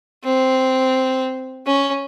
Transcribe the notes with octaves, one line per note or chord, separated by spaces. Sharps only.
C4
C#4